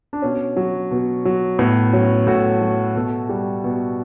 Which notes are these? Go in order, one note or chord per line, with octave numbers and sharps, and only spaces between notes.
D4
B2 C#4
F#3
B2
F#3
A2 B3
F#3 C#4
A2 F#4 A4
F#3
B2 F#4 A4
G3
B2